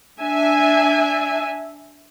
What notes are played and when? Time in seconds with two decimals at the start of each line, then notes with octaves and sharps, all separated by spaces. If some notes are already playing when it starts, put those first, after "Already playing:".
0.20 D4 E5 G#5